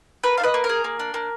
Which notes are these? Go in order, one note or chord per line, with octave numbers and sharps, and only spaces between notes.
A#3 B4
D4 F5
B4 D#5
A#3
A#4
G#4
A#3
D4
A#3